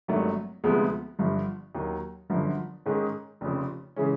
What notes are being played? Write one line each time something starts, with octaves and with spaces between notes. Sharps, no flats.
G#1 G2 D#3 F#3 A3
D2 C3 F3 G#3 B3
G1 G2 D3 F3
D#2 D#3 F#3
G1 F#2 D3 F3
G#2 D#3 G#3 C#4
F1 F2 C#3 F3
C#3 E3 G#3 C#4